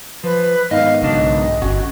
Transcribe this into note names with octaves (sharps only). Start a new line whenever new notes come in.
F3 B4
G#2 D#3 B3 D#5 F5
B1 C#3 D4 D#5
G1 C#4 F#4